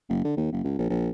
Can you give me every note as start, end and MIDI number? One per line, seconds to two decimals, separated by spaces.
0.09 0.22 30
0.24 0.33 50
0.37 0.47 39
0.52 0.61 30
0.64 0.77 37
0.78 0.86 34
0.90 1.09 34